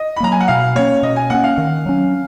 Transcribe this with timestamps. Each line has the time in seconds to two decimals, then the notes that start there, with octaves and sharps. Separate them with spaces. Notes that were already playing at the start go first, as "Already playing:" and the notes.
Already playing: D#5
0.16 B5
0.20 F#3 A#3 A#5
0.32 G#5
0.40 F#5
0.48 B2 F5
0.75 A#3 C#4 C#5
1.03 B2 D#5
1.16 G#5
1.30 A#3 C#4 F#5
1.44 F5
1.58 D#3
1.86 F#3 C#4